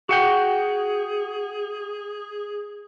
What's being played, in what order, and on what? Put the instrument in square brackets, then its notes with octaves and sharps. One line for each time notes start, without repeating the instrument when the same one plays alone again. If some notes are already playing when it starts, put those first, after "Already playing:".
[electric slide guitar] F#4 F#5 G5 [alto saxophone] G#4